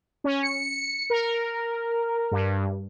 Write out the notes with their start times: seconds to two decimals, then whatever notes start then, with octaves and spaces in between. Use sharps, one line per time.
0.24 C#4
0.43 C#7
1.10 A#4
2.31 G2